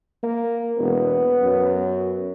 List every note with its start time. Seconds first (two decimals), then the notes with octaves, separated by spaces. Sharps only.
0.23 A#3
0.79 E1 B3
1.42 F#2